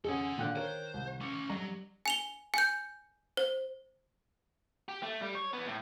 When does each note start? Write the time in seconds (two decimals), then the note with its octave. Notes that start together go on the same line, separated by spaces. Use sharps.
0.05 F2 C#4 G#4 A4 F#5 G#5
0.38 A#2 D3 D#3 D4 G5 F#6
0.56 A#4 C5 C#5
0.94 C2
1.21 A3 C#4 D6
1.50 F#3 G3 A#5
2.06 G#5 F7 G7
2.54 G#5 G6
3.37 C5
4.89 G4
5.03 A3
5.22 G3
5.35 C#5
5.53 E3 B3
5.67 A2